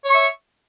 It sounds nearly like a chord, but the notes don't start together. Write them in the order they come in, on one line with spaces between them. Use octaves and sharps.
C#5 C#6 E5